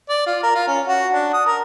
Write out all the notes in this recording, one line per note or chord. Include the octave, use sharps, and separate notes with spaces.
D5
F4
A#4
F4
C#4
F#4
D4
D#6
A#4